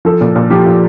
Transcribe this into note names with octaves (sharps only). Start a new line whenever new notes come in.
F3 A4
A#2
A#2
F3 G4
F3